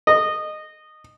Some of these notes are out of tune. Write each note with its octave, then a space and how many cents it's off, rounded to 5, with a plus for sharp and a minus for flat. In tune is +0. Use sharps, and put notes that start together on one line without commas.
D#5 -15